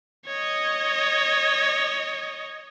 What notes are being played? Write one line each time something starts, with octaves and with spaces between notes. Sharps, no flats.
C#5 D#5